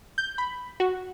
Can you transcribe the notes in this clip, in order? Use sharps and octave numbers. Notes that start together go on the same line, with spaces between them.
G6
B5
F#4